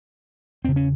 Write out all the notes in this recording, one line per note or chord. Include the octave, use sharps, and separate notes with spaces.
E2 C#3 C4
C#4